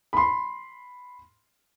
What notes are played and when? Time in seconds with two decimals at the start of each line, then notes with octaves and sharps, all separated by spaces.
0.13 B5 C6